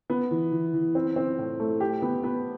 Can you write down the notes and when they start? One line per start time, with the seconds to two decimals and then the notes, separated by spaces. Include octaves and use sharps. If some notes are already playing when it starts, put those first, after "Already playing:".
0.10 B3
0.31 E3
0.52 E3
0.73 E3
0.95 C4
1.16 C4
1.38 A2
1.60 A3
1.80 G4
2.02 B3
2.24 B3